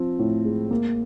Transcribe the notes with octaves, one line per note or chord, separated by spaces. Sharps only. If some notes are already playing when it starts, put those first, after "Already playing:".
Already playing: F3 C4
A2
G#3
A#3